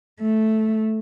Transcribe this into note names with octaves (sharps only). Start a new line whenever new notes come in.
A3